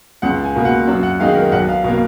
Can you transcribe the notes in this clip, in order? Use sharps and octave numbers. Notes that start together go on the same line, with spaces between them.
C#2 F#5
G#5
B2 A#3
F#5
F#2
F#5
D#3 G#3 D#4 F5
A#4
B1 F#5
F5
B2 A#3 F5